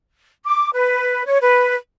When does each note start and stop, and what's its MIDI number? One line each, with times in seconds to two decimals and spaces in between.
0.45 0.69 86
0.74 1.24 71
1.25 1.38 73
1.41 1.74 71